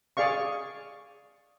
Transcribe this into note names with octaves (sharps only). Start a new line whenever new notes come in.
G#4 D5 F5 C#6